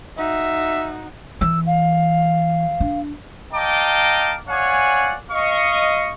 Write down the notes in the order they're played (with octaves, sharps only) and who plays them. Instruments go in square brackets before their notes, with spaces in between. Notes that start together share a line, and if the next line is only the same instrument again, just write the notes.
[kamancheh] D#4 F#4 [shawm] E5
[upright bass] E3 [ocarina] E6
[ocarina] F5
[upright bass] D4
[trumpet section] D#5 F5 G5 A5 A#5 D6
C#5 D5 F5 F#5 G#5
D#5 F5 C#6